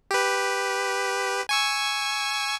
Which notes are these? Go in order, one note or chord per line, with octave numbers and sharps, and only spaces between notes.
G4 B4
G#5 C#6 E6